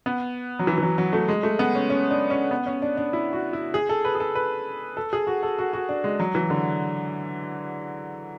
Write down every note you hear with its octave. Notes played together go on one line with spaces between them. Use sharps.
B3
F#3
E3
E3
F#3
F#3
A3
G#3
A3
B3
C#4
C#4
D4
C#4
B3
C#4
D4
D4
E4
F#4
E4
G#4
A4
B4
G#4
A4
B4
A4
G#4
F#4
A4
F#4
F#4
D4
G#3
F#3
E3
D3